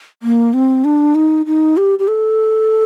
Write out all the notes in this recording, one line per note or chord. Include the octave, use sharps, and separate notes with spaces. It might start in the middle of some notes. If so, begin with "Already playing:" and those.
A#3
C4
D4
D#4
D#4
G4
G4
A4